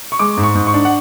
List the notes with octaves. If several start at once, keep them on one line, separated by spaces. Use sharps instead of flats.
C#6
G#3 D6
G#2
C#6
G#2
C#6
D4
F#5